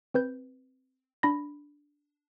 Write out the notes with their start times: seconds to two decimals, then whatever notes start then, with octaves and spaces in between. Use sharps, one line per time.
0.14 C4 B4 G6
1.23 D4 B5 A#6